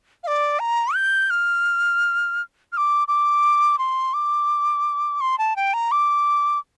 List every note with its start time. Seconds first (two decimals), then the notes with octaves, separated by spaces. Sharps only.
0.24 F5
0.27 D5
0.59 A#5
0.95 G6
1.30 F6
2.72 F6
2.77 D6
3.08 D6
3.78 C6
4.14 D6
5.21 C6
5.38 A5
5.56 G5
5.74 A#5
5.92 D6